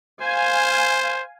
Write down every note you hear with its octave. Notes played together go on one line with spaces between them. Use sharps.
C5 F5 G#5